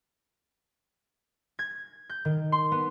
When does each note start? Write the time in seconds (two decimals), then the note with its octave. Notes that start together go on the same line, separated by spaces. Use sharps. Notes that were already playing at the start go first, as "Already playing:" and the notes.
1.59 G#6
2.10 G6
2.25 D#3
2.52 C6
2.72 B3